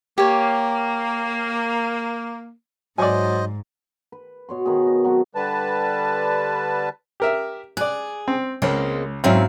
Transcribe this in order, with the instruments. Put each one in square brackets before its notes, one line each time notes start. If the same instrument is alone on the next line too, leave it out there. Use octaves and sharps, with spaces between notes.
[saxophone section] A#3 [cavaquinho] G4 C#5
[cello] G#2 [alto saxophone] F#3 [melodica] C5 D#5 [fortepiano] D5 G#5
[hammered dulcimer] B4
B2 C#5 C6
D#3 B3 G#4
D#5
F#3 B3 C4 A4
[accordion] D3 G3 B4 A5
[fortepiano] G4 A#4 E5
[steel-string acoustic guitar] G#4 [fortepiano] D5 F#6
[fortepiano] C4
[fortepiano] C#2 C#4 [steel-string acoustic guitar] G#3 A#3 C4
[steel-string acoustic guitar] G#2 F#3 F5 [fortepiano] C4 C#4 E4